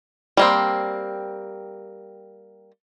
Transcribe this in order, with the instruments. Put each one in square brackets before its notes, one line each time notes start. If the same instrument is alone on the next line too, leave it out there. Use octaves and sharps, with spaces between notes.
[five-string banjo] G3 A#3 C4